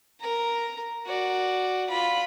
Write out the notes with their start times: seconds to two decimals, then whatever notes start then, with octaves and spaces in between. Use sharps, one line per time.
0.20 A#4 A#5
1.06 F#4 D5
1.90 F4 B5